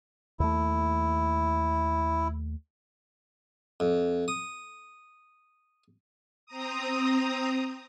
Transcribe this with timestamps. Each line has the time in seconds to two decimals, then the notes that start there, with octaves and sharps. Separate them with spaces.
0.40 D#2 A3 E4
3.80 F2
4.28 D#6
6.46 C4 A#5 D#6